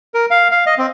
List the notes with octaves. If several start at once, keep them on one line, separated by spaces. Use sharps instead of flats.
A#4
F5
F5
D#5
C4